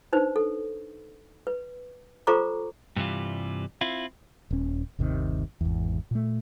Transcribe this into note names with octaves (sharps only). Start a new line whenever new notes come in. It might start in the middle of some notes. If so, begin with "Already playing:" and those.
D4 D#4 B4 C5
A4
B4
F4 A4 C5 A#5 C#6 D6
G2 C3 E3 G3 F4
C4 E4 F4
D#1 C#4
G1 D#2 C3 D#3
G#1 E2
A#2 A3